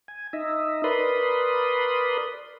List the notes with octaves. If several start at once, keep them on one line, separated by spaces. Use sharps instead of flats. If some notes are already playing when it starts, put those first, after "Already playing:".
G#5
D#4 D#5 E5
A#4 B4 D5 B5 C6 D#6